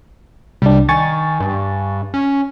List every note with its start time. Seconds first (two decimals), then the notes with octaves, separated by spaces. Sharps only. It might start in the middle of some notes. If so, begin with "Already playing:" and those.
0.62 C2 G3 D4
0.89 D#3 G#5 C#6 A6
1.40 G2
2.14 C#4